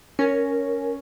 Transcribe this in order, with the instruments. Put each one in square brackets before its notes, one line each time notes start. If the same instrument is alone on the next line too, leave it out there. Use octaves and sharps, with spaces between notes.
[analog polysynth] C#4 [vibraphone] A#4